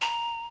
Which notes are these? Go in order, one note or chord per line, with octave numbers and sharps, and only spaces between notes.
A#5